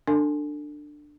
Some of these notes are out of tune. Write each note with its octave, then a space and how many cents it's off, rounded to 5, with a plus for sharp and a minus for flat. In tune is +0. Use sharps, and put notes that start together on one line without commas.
D4 +15 A4 +30 G#5 +10